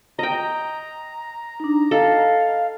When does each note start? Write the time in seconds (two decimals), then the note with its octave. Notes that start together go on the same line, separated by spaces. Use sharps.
0.19 D#5 G5 A#5
1.60 D4 D#4
1.91 A4 D#5 F5